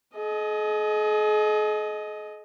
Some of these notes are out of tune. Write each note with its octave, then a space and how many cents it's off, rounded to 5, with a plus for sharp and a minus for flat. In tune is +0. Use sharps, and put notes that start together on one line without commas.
G#4 +45 D#5 +0